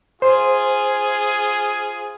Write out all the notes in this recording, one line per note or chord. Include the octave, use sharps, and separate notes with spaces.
F4 G#4 C5